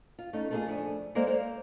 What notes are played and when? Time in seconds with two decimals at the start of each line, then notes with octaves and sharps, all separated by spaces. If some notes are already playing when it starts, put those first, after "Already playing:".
0.18 F4
0.33 A3 C#4 D#4
0.51 A3 A#3 D4 E4 F4 G#4
0.67 F2 A3 D4 G#5
1.15 G#3 A#3 A4 C5 D5
1.27 A#3 C5 C#5